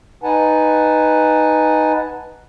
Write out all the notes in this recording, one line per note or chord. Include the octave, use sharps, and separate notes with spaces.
D#4 B4 F#5 G#5 A5